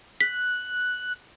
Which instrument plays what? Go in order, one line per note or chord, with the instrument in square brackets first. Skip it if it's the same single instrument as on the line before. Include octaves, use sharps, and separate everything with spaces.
[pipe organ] F#6 [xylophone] B6